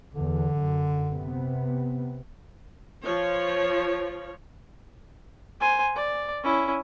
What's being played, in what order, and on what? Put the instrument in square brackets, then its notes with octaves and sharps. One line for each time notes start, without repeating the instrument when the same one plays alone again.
[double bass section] E2 [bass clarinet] D3
[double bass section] F#2
C3 B3
[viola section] F3 C#5
[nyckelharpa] C5 G#5
D5
C#4 E4